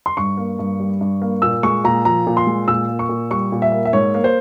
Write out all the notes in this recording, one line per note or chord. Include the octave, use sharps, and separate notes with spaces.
C6
G2 C#6
A#3
G2
G3
G2
A#3
A#2 E6
G#3 C#6
A#2 A#5
F3 A#5
A#2
C6
G#3
A#2 E6
A#3
C#6
A#2
G3 C#6
A#2
E5
A#3
E5
G#2 C#5
A#3
C5